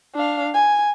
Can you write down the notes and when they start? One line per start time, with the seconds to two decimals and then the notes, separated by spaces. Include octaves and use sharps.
0.15 D4 F5
0.55 G#5